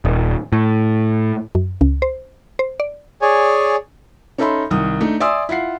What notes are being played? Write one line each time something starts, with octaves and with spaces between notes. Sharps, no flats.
D#1
A2
F#2
C#2
C5
C5
D5
G#4 C#5 D5 G#5
C#4 D#4 A4 E5 B5 C6
C2 D#3 D#6
A3 D4 D#4
D5 E5 G#5 C6 D#6 E6
E4 F4 F#5 C7